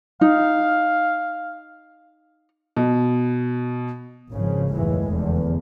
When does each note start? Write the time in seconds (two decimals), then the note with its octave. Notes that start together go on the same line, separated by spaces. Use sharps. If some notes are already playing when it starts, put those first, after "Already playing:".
0.21 D#4 F5
2.76 B2
4.32 G#1 C#3 F3
4.71 F#1 D#2 A2 E3 G#3
5.09 F1 E2 D3